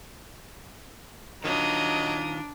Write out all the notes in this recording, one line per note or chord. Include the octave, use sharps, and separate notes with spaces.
D#3 F#3 D4 F4 D#5 A#5 D#6